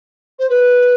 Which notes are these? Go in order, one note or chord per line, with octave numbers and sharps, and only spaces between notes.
C5
B4